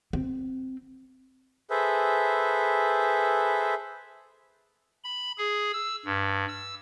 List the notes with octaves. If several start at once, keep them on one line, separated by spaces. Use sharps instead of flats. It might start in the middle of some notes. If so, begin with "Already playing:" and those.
C4
G#4 A4 B4 C5 E5
B5
G#4
E6
G2
E6